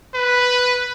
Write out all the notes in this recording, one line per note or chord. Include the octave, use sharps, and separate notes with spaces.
B4